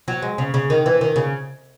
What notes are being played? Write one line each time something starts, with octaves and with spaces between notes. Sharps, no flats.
F#3
G#3
C#3
C#3
D#3
E3
D#3
C#3